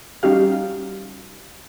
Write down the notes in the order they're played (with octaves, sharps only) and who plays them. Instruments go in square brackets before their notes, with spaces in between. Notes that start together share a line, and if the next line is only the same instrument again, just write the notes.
[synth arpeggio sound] G3 C#4 D#4 F#4 G4 F5